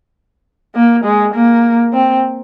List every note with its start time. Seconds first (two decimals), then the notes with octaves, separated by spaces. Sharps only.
0.75 A#3
1.04 G#3
1.34 A#3
1.93 C4